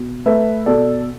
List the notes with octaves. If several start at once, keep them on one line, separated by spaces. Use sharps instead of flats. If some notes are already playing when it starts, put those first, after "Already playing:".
Already playing: B2
A3 B4 E5
B2 A4 D5